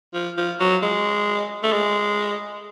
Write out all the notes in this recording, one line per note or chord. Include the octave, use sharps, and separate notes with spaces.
F3
F3
F#3
G#3
A3
G#3